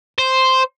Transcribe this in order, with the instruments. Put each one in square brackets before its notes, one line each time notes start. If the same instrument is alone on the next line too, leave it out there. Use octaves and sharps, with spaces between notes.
[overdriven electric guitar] C5